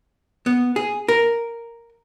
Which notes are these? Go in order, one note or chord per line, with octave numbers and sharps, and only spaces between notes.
B3
G#4
A#4